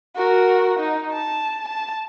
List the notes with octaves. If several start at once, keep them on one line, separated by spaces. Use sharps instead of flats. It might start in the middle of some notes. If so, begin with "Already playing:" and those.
F#4 A#4
D#4
A5
A5